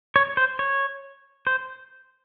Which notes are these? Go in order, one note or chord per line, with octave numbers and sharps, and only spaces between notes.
C#5
C5
C#5
C5